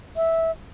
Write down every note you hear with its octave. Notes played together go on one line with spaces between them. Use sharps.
E5